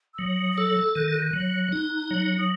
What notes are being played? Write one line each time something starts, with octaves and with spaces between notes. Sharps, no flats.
E6
F#3 D#6
D#6
A4 E6
D#3 F#6
F#6
F#3
D#4
F#3
D#6